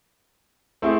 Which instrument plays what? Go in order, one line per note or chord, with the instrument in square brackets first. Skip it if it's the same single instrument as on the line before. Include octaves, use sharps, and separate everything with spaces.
[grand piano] A3 C4 E4 G#4